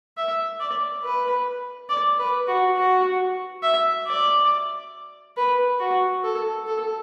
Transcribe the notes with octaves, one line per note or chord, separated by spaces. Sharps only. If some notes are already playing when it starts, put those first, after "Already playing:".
E5
D5
B4
D5
B4
F#4
F#4
E5
D5
B4
F#4
A4
A4